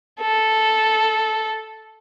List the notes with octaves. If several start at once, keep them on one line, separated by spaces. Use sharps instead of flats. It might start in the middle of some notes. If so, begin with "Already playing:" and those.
A4